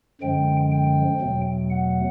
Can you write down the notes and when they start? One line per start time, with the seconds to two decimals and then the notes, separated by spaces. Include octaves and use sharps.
0.21 F#2 D3 F3 G#3 G5
0.71 G5
1.21 E2 B2 F#3 A3
1.70 F#5